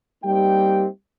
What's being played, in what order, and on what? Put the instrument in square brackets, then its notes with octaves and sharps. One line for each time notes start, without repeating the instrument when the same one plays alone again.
[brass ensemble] G3 A#3 C4 D#4 G4 G5